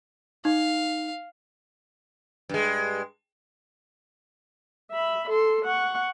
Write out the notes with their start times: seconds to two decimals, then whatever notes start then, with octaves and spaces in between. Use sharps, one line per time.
0.45 D#4 F5
2.49 G2 G#3
4.91 E5 B5
5.29 A4 C6
5.65 F#5 C#6